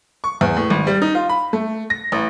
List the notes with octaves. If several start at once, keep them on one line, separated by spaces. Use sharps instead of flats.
C#6
E2
A2
G#1
G3
D#4
F4
B5
A3
A#6
A1